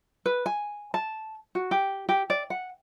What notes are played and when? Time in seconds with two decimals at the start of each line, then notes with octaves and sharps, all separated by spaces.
0.26 B4
0.46 G#5
0.94 A5
1.55 F#4
1.71 G4
2.09 G4
2.30 D5
2.50 F#5